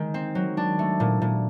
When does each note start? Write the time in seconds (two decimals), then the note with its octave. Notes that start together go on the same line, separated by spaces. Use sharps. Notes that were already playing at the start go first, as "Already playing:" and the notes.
Already playing: D#3 G#3
0.14 C4
0.35 F#3
0.57 D4
0.79 A3
1.00 A#2
1.22 A#2